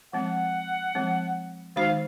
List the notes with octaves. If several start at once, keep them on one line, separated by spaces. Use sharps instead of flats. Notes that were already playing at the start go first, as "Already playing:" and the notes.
F3 G#3 C4 F#5
F3 G#3 C4
D#3 G#3 D#4 F#4 C5 F5